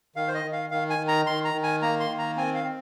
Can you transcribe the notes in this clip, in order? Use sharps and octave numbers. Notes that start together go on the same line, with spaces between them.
D#3 F5
C5
D#5
D#3
F5
D#3 F5
G#5
D#3
A#5
D#3 C6
A#5
D#3
G#5
A#3 A#5
C6
D#3
A#5
C4 G#5
F5
C4